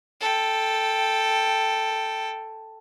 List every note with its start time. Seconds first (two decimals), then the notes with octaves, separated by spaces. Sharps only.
0.21 A4 G5